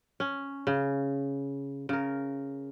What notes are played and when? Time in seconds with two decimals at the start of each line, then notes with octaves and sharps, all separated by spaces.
0.20 C#4
0.67 C#3
1.89 C#3 A#4